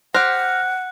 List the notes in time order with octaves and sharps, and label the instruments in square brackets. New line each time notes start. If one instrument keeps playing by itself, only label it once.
[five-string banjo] G4 C5 [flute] F#5 [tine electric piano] F6 A#6 [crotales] F#6